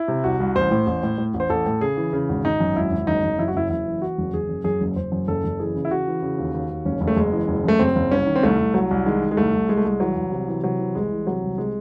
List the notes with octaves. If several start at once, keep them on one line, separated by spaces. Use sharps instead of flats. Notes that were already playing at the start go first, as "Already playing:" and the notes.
Already playing: E4
C3
C2 F#4
C2
A1 C5
A2
A1
A2
A2
A1
C5
A1 A4
A2
C#3 G#4
E3
C#3
G#1
G#1 D#4
F#2
G#1 E4
G#1
F#1 D#4
F#1
F#2 E4
F#4
F#1 E4
F#1 E4
E3
E3 F#4
F#1
F#1 G#4
F#2
F#2 G#4
F#1
F#1 C5
F#2
F#1 A4
F#1
E3 G#4
C#3
E4
C#3 F#4
E3
C#3
D#2
D#2
D#2
F#1 C#4
F#1
A3
F#1 G#3
E3
F#1
F#2 A3
F#1 C4
F#1
C2 C#4
D#3
C4
C2 A3
C2
C2 F#3
C2
D#3 G#3
D#3
G#3
C2 A3
C2
C2 G#3
A3
C2 G#3
E3 F#3
C2
C3
E3
C3 F#3
E3
C2 G#3
E3
C3 F#3
C2
C3 G#3